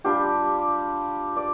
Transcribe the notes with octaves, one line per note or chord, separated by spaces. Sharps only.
G3 D4 F4 G4
D5